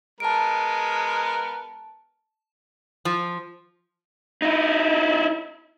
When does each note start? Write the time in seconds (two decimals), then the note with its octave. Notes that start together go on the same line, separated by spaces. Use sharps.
0.20 G#3 B3 A#4 A5 D7
3.05 F3
4.42 D#4 E4